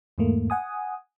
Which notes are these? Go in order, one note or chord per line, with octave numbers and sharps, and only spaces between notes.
E2 G#2 A3 A#3
F#5 G#5 D#6